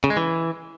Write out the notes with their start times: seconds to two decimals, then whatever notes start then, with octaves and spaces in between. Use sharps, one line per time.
0.04 C#3
0.10 G#3
0.17 E3